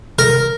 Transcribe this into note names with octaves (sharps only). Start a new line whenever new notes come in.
A#4